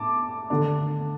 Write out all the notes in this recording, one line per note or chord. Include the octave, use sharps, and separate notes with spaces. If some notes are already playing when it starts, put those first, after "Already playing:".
Already playing: A2 A5 D6
D3 A3 D4